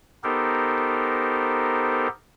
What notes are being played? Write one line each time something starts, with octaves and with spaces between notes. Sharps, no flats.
B3 D#4 G4 A4 A#4 C5